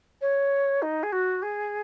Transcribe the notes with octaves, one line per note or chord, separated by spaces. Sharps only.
C#5
D#4
G#4
F#4
G#4